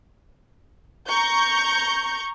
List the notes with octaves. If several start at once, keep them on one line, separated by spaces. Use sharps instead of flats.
A#5 C#6 G6